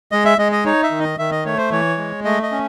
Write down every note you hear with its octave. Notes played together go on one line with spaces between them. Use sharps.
G#3 D#5
E5
G#3 D#5
D#5
D#4 C#5
E5
D#3
D#5
D#3 E5
D#5
A3 C#5
C5
E3 C#5
G#3
A3 D#5
D#5
C#4